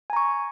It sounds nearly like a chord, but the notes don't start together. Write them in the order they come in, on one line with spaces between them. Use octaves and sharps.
G#5 A#5 C#6